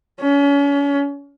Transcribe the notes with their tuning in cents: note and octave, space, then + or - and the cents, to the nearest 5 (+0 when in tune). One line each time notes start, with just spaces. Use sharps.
C#4 +35